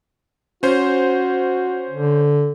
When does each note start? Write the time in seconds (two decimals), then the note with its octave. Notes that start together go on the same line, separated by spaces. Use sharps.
0.63 C#4 F#4 C5
1.90 D3